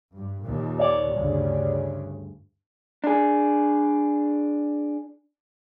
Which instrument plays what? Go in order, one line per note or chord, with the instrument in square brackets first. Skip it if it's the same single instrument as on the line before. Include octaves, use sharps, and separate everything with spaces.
[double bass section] G2
D#2 A#2
[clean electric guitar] C#5 D5
[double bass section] D2 G2 C#3
[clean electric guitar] D4 G#4